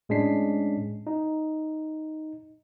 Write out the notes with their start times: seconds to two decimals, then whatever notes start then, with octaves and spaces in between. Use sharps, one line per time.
0.09 A2 G#3 C#4 D4 B6 C7
1.07 D#4